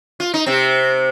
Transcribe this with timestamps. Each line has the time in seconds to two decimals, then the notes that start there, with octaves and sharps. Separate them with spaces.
0.20 F4
0.34 D#4
0.46 C3 C4